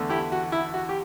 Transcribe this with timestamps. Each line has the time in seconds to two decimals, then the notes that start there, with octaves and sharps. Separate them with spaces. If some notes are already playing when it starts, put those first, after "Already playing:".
Already playing: E2 D3 A3
0.10 E4 G4
0.32 F#4
0.52 E4
0.74 F#4
0.89 G4